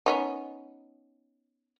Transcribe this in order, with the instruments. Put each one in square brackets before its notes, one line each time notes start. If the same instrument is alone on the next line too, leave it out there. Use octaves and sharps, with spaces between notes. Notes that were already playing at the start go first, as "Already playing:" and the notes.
[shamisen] B3 C#4 D#4